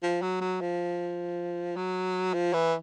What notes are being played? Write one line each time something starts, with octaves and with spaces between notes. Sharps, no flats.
F3
F#3
F#3
F3
F#3
F3
E3